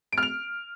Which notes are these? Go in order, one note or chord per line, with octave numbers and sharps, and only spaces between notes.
D7
F6
F7